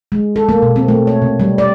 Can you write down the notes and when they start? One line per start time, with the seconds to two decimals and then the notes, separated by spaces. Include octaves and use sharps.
0.12 G#3
0.36 A4
0.49 A#3
0.62 B2
0.76 C4
0.88 A3
1.07 C#5
1.22 C3
1.40 G3
1.58 D5